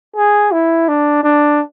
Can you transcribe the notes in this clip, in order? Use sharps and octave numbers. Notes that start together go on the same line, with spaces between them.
G#4
E4
D4
D4